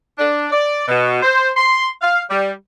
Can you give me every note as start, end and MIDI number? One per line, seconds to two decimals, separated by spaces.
0.18 0.47 62
0.52 0.84 74
0.88 1.19 47
1.22 1.50 72
1.56 1.88 84
2.01 2.21 77
2.30 2.52 55